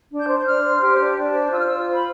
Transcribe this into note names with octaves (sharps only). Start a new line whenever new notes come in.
D4
G6
C5
G6
D4 F6
C5
G4
D4
D4
C5
F4 E6
F6
F4 E6
C5
B5